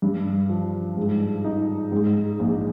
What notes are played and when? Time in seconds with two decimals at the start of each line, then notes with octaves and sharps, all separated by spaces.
0.02 G2
0.49 F3
0.97 G#2
1.44 D#4
1.92 G#2
2.39 A#1